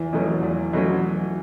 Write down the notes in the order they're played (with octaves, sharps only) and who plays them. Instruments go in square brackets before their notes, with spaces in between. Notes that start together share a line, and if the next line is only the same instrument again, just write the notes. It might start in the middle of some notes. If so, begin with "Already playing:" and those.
Already playing: [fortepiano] E2 [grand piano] E3
[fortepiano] B2 F#3 A3 C#4
E2
B2 F#3 A3 C#4